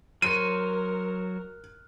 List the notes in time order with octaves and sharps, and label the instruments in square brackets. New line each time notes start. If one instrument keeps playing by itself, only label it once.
[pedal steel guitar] F#3 C5 C#5 [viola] A#4 [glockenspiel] F6 F#6 [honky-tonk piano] D#7